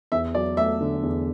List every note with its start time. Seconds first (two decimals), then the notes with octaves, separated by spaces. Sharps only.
0.12 E2 E5
0.35 F#3 D5
0.57 A3 E5
0.80 D3
1.03 E2